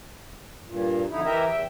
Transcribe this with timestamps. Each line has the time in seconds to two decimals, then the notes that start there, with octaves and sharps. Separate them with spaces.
0.66 G2 A#2
1.10 F2 D3 D#4 E4
1.25 E3 E4 G4 A#4 D#5 E5
1.46 E2 E5 G5